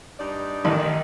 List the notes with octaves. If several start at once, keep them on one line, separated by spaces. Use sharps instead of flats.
G2 D#4 D5
A1 D#3